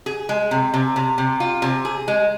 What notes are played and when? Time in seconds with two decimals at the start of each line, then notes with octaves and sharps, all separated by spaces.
0.06 G#4
0.29 G#3
0.51 C3
0.74 C3
0.96 C3
1.18 C3
1.40 F4
1.62 C3
1.85 G#4
2.08 G#3